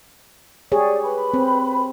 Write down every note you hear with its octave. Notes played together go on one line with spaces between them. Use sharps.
G4 G#4 C#5 D5
B4 B5
C4